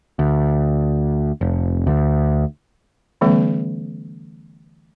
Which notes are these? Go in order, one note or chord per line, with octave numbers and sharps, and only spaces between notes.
D2
F1
D2
D3 E3 G3 A3 B3 C#4